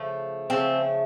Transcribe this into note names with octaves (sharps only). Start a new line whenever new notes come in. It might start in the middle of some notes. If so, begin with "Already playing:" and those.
Already playing: C#3 F3 A3
C#3 F3 A3 C4